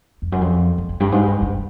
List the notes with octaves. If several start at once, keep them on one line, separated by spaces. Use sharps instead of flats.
F2
F#2
F2
F2
F2
G2
G#2
G2
G2